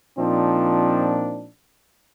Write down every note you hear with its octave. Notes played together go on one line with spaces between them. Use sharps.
A#2 F3 C4 D4 D#4